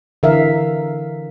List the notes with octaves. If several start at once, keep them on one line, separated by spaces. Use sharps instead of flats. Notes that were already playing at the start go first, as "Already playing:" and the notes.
D3 E3 A#4 E5 F5